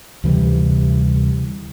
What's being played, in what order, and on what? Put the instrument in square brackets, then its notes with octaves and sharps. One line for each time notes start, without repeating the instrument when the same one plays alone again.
[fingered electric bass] D2 C3 E3 G3